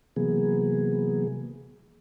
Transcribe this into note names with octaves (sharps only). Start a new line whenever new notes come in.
C3 E3 F#3 A#3 B3 G#4